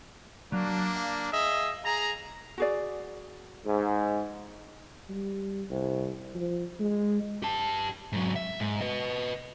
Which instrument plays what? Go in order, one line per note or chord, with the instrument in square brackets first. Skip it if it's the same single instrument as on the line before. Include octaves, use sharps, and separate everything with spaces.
[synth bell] F#3 [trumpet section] A#3 D4
[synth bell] F5
[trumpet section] G#4 D#5 E5
G#4 A#5
[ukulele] F#4 G#4 D5
[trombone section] G#2
[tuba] G3
C2
F3
G#3
[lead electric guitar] G4 A5
G#2 F#3
E5
G#2
B4 D#5